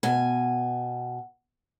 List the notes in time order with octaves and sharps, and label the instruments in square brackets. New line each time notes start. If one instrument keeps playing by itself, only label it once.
[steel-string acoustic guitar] B2 G#5